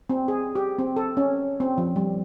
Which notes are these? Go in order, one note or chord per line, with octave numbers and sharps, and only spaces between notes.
C4
G#4
G4
C4
A4
C#4
C4
F3
G3